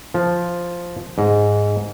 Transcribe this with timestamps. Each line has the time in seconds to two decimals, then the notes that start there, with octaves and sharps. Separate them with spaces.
0.14 F3
1.18 G#2